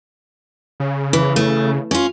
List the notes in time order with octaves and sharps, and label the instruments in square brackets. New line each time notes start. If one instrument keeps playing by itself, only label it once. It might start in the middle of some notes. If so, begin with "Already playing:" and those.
[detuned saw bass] C#3
[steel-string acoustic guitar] E3
A3
C#4 F4